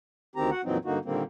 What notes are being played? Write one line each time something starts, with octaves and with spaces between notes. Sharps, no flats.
D2 D#3 C4 G4 A#5
F#4 F#5
F2 A#2 E3 F#3 C4 D#4
G2 D3 A#3 D#4 F#4
A#2 D3 D#3 G3 A#3 C4